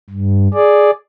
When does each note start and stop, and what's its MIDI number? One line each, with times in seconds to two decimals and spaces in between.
0.10 0.48 43
0.54 0.91 68
0.54 0.91 74